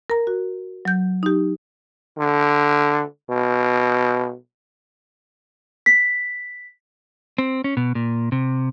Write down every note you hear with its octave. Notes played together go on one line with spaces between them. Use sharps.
A#4 A#5
F#4
F#3 G6
D#4 G4
D3
B2
B6
C4
C#4
B2
A#2
C3